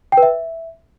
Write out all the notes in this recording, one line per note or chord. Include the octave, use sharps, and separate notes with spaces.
G5
B4
E5